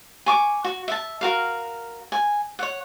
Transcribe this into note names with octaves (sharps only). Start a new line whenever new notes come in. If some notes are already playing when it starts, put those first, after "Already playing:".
G#5 C#6 D6
F#4
E5 A5
F#4 A#4 F5
G#5
C#5 F#5